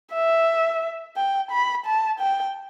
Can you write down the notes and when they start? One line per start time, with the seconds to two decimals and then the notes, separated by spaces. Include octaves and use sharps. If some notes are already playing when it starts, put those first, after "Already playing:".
0.14 E5
1.17 G5
1.51 B5
1.86 A5
2.20 G5